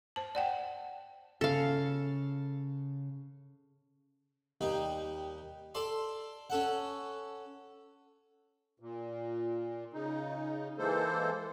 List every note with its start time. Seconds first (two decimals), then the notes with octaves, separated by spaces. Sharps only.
0.16 C5 A5
0.35 D5 F#5 G5
1.41 C#3 A4 F5
4.61 D#2 G3 D#4
5.75 A4 D5 C6
6.50 C#4 A4 F#5
8.80 A#2
9.94 C#3 D#4
10.78 E3 G#3 A#3 A4 C5